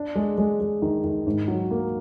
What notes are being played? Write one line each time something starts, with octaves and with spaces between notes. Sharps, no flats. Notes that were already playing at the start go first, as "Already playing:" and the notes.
Already playing: D4
G#3
G#3
G#3
D#3
D#3
G#2
F#3
A#3